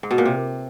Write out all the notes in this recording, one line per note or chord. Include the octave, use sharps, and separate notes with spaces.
G#2
B2
A#2
C3